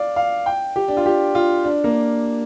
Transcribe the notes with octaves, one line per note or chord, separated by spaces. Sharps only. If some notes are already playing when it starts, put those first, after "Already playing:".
Already playing: D5 F5
F5
G5
G4
D4
F4
G4
F4
D4
A#3